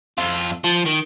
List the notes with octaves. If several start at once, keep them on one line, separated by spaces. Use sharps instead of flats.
F2 F4
F3
D#3